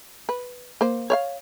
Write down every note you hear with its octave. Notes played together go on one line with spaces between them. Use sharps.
B4
A#3 C5
C#5 D5 F5